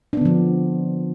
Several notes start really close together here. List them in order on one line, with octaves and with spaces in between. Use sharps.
D4 B3 D3 F3